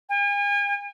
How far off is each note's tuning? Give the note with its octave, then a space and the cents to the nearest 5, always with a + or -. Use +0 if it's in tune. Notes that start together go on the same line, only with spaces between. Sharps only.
G#5 -40